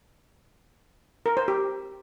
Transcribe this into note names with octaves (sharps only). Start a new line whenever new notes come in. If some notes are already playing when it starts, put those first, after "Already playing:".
A#4
C5
G4